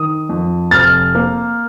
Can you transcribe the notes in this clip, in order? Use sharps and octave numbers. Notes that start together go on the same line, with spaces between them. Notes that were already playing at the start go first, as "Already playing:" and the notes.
Already playing: D#3 D#6
F2
F1 F6 A6
A#3